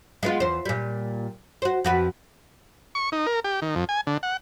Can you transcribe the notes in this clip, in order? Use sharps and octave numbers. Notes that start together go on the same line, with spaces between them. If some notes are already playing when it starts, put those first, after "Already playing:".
G#3 B3 F4
E2 C5
A#2 G3
F#4 C5
F2 F#4 B4
C#6
D#4
A#4
G4
D#3
F2
G#5
D3
F#5